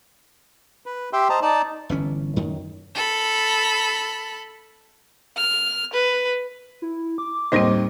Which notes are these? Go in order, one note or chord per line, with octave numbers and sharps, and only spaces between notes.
B4
G4 E5 G5 C6
C5 D#5 A5 A#5
D#4 D5 A5
G1 E3 C#4
F#2 D#3
A4 B5
F6
B4
E4
D6
D#2 A2 D#3 G3 C4 C5 D#5